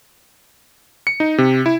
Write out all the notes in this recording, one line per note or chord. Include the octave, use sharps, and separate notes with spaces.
C#7
D#4
C3
E4